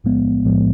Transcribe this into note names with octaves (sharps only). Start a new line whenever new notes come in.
B1 A2 F3 G#3 B3
B1 A2 F3 G#3 B3